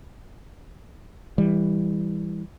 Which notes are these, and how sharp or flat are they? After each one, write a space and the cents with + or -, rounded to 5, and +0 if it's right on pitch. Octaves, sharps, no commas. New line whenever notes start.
E3 -10 G3 +15